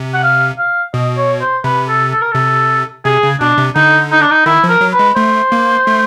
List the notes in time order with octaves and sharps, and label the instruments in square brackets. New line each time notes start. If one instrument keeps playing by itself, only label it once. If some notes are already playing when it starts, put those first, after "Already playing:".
Already playing: [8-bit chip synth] C3
[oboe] F#5
F5
F5
[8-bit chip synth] B2 [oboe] D#5
[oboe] C#5
C5
[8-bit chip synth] C3 [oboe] B4
[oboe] A4
A4
A#4
[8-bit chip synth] C3 [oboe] A4
[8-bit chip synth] C3 [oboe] G#4
[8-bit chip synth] C#3
[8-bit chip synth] B2 [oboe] D4
[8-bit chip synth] C3
[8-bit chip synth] D3 [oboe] D#4
[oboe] D#4
D4
D#4
[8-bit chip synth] D#3 [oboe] E4
[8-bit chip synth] F3
[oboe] A#4
[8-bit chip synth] F#3
[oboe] B4
[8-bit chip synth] G#3
[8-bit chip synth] A3 [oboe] C5
[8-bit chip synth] A#3
A3